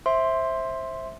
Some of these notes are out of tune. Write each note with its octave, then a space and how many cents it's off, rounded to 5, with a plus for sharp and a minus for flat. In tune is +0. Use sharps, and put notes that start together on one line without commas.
C5 +20 E5 -5 C6 +0